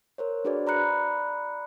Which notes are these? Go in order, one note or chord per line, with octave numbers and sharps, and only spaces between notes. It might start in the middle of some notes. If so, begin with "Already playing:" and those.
A#4 C5 C#5
D4 F#4 G#4 B4 C5 D5
D5 A#5 B5 F#6 C#7